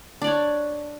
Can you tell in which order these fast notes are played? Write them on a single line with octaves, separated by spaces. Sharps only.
D4 D5 C#5